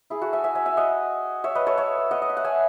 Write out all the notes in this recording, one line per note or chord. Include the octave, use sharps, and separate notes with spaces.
E4 G#4
F#4 A4
E5 G#5
E5 G#5
E5 G#5
E5 G#5
D#5 F#5
C#5 E5
B4 D#5
A4 C#5
C#5 E5
D#5 F#5
D#5
E5
F#5
E5 G#5